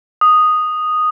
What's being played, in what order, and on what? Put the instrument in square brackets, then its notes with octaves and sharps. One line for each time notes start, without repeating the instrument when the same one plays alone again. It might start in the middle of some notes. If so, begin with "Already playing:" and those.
[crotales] D#6